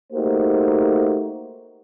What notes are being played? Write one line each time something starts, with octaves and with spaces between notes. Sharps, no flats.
A3 A#3 D#4 F#4 G4 C5